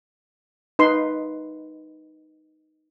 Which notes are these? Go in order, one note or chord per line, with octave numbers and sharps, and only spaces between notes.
D#4 B4 C6